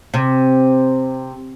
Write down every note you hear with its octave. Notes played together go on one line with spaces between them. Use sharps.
C3